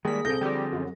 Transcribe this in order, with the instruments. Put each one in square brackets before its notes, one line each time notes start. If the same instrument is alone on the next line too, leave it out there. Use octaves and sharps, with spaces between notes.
[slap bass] D#3 G#3 [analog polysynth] G3 B6 [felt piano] A#3 [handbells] G#4
[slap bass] C2 A#2 [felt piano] C4 A4 A#6 [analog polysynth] G6
[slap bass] D3 F3 [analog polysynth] G3 G4
[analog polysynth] F#2